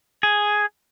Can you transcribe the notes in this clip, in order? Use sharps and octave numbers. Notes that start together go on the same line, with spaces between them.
G#4